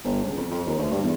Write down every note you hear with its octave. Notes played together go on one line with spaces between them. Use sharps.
G1
C#2
F2
F2
D#2
D2
G2
E2